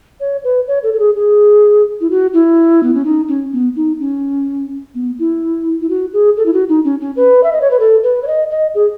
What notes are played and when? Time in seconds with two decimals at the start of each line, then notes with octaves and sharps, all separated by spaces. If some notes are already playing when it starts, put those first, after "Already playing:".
0.20 C#5
0.44 B4
0.68 C#5
0.83 A4
0.94 A4
0.99 G#4
1.16 G#4
2.01 E4
2.10 F#4
2.34 E4
2.83 B3
2.94 C#4
3.05 D#4
3.28 C#4
3.53 B3
3.76 D#4
4.00 C#4
4.95 B3
5.19 E4
5.81 E4
5.89 F#4
6.13 G#4
6.37 A4
6.46 E4
6.53 F#4
6.69 D#4
6.85 C#4
7.01 C#4
7.16 B4
7.44 E5
7.52 D#5
7.61 C#5
7.71 B4
7.80 A4
8.03 B4
8.23 C#5
8.27 D#5
8.50 D#5
8.75 G#4